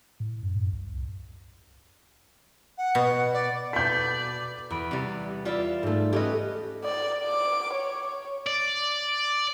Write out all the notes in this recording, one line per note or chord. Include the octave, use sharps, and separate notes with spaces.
A2
F#2
F#2
C2
F#5
B2
D5
B2 F#4 A4 B4 D5 G6 B6
E2 B5 D7
C3 G3
G3 F4 B4 D5 E5
G#2 A3
A3 C#4 G4 B4 D#5
D5
D6
C#5
D5